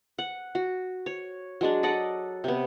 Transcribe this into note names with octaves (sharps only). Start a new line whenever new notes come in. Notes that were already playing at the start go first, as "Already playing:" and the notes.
F#5
F#4
C#5
F#3 G#3 D4
A4 D5 D#5 F#5
C3 B3